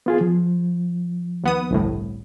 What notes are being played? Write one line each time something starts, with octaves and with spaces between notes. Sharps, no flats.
B3 F4 G#4
F3
D#2 B3 D#6
G1 C2 A2